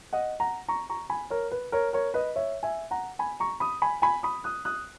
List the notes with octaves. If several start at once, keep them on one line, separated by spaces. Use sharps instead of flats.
D#5 F#5
F#5 A#5
A#5 C#6
A#5 C#6
G#5 B5
A#4 C#5
B4
A#4 C#5
A#4 C#5
B4 D#5
C#5 E5
E5 G#5
F#5 A#5
G#5 B5
A#5 C#6
B5 D#6
G#5 B5
G#5 B5
B5 D#6
D#6 F#6
D#6 F#6